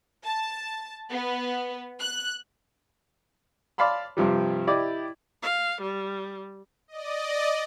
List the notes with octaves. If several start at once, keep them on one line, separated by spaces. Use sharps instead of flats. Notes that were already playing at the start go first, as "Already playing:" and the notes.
A5
B3
F#6
D5 F5 A5 B5 C6
G2 C3 F3 G3
E4 G4 D5 D#5
F5
G3
D5 D#5